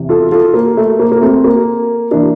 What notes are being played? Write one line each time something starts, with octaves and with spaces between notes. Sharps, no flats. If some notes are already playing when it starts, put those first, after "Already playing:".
Already playing: E2 C3 E3
F4 A4
F4 A4
A#3
A3
A#3
A#3
A3 C4
A#3
E3 A#3 D4